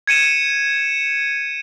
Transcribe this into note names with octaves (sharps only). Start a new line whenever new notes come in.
G#6 C#7 D#7 E7